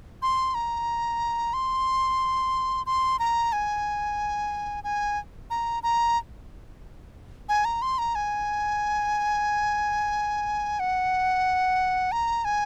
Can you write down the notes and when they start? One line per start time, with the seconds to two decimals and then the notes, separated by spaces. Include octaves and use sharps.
0.22 C6
0.55 A#5
1.54 C6
2.86 C6
3.19 A#5
3.53 G#5
4.84 G#5
5.50 A#5
5.83 A#5
7.49 G#5
7.65 A#5
7.82 C6
7.98 A#5
8.15 G#5
10.80 F#5
12.12 A#5
12.45 G#5